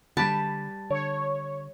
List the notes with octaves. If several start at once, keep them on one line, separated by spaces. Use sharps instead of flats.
D3 G3 G4 B4 A5
D3 C#5